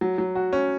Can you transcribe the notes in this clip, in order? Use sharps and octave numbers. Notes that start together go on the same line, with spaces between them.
F#3
F#3
F#4
C#4